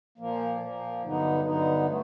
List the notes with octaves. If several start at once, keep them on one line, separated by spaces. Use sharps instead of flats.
A#2 F3 A#3
A#2 F3 A#3
G2 D3 F#3 B3 D#4
G2 D3 F#3 B3 D#4
A3